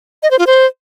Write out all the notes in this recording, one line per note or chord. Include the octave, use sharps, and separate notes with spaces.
D#5
C5
F4
C5